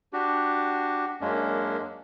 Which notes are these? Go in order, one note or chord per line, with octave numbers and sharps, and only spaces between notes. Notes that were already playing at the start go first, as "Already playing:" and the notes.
D4 F#4 G4
F#2 G#3 A#3 C#4 D4